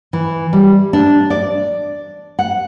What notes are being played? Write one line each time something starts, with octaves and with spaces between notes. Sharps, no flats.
E3
G3
D4
D5
F#5